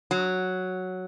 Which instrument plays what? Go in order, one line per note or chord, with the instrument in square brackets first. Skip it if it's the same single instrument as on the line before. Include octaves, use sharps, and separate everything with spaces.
[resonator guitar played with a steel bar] F#3